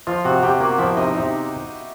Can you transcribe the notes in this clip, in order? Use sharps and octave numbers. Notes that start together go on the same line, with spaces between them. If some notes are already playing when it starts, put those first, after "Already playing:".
F3 F4 F5
C3 F#4 F#5
C3 G4 G5
A#3 F#4 F#5
F3 E4 E5
C3 D#4 D#5
C3 D#4 D#5